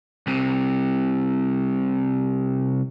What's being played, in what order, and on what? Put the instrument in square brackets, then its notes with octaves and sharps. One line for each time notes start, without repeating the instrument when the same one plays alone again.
[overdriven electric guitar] C2 C3